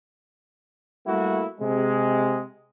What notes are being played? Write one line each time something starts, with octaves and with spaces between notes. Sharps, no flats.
G3 A3 A#3 E4 F#4
C3 G#3